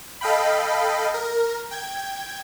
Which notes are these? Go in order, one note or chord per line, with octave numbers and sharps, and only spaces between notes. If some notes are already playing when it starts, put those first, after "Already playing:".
A4 D#5 F5 G5 B5
A#4
G5 G#6